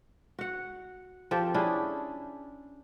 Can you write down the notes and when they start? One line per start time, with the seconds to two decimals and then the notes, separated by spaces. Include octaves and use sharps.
0.39 F#4 F#5
1.31 F3 C4 G4 A4
1.54 C#4 D4 E4 G#4